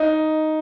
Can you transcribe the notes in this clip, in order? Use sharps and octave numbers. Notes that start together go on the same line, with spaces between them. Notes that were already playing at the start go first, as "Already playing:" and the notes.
Already playing: D#4